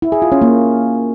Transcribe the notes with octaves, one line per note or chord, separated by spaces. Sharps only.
E4
G#4
F4
C#4
A#3